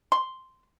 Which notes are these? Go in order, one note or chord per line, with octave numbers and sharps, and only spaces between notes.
C6